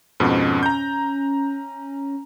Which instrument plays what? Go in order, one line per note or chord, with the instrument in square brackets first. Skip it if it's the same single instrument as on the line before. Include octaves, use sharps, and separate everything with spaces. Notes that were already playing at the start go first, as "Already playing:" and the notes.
[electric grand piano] F2 G#2 B2 [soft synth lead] C#4
[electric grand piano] A#5 G6